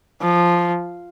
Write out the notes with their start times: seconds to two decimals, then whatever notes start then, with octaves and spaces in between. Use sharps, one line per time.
0.21 F3